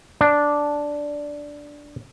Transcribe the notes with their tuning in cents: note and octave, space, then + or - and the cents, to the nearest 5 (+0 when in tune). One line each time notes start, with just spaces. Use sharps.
D4 -5